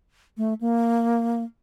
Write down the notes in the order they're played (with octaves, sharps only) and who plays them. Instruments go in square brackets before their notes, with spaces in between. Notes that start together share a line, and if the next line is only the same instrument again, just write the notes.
[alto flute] A3
A#3